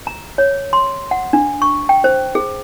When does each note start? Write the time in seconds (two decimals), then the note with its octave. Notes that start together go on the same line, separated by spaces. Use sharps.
0.07 A#5
0.38 C#5
0.73 C6
1.11 F#5
1.33 D4
1.62 C#6
1.89 G5
2.04 C5
2.35 G#4